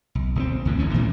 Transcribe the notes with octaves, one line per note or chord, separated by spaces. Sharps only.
B1
B1 A3 C4
D2 A2 E3
D1 A1 A2 C#4
A2 E3 G#3 A3